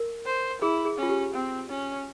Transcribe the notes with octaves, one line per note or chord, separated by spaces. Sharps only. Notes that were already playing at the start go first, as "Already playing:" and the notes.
Already playing: A#4
C5
E4 G#4
G#4
C#4 F4
G4
C4
C#4